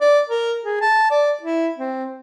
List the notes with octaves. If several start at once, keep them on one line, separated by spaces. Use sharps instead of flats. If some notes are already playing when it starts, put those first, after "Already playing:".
D5
A#4
G#4
A5
D5
E4
C4